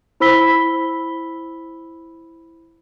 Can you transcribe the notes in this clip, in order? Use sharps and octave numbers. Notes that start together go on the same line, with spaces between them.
E4 C5 B5 E6 B6 G7